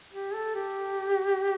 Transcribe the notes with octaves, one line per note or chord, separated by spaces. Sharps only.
G4
A4
G4